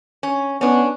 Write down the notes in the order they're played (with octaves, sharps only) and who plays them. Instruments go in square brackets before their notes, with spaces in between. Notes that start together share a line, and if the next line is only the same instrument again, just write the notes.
[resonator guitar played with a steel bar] C#4
[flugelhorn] B3 [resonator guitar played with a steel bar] C#4 D4